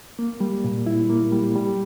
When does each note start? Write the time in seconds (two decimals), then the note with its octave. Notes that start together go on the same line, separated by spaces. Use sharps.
0.19 A#3
0.40 G3
0.64 A#2
0.86 E4
1.10 A#3
1.32 G3
1.56 G3